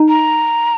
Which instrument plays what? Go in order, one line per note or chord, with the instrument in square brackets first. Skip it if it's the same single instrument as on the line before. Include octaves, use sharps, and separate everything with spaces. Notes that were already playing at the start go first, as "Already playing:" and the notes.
Already playing: [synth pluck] D#4
[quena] A#5